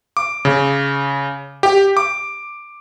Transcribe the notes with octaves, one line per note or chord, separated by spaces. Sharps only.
D6
C#3
G4
D6